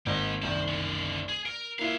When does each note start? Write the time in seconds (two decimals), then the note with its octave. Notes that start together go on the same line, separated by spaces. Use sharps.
0.06 G#1 A#3 D#5
0.42 F#1 C2 D#3 C5 A5
0.68 D3 C#4
1.29 G#4
1.46 A#4 D7
1.79 A#3 E4 F4 B4 F5